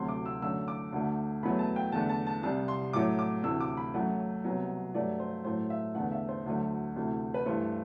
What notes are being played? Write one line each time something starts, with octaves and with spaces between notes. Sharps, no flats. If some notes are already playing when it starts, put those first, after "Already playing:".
Already playing: D2 C3 F#3 A3 C6
D6
E6
F#2 D3 A3 E6
D6
D2 D3 A3
E2 B2 F#3 A3 B5
A5
G5
E2 D3 A3 A5
A5
A5
C2 C3 G3 A5
C6
A2 F#3 A3 D6
D6
D2 C3 E3 A3 E6
D6
B5
F#2 F#3 A3 F#5
C2 B2 F#3
G2 F#3 A3 D5
C5
A2 F#3 A3 C5
E5
E2 D3 A3 F#5
E5
C5
D2 D3 F#3 A3
D2 C3 E3 A3
B4
G2 E3 A3 C5